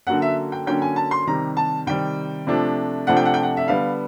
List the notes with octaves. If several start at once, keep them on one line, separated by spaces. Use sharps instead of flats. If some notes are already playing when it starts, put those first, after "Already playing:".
D3 F#3 A#3 C#4 F#5
E5
G5
D3 F#3 A#3 C#4 G5
G#5
A5
C6
C3 D#3 G3 A#5
A5
C3 D#3 G3 G5
C3 F3 A3 D4
C3 F3 A3 D4 F#5
G5
F#5
G5
F#5
E5
D3 G3 B3 F5